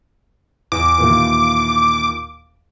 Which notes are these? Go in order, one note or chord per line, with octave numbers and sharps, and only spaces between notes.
E2 D6
D#2 A#2 E3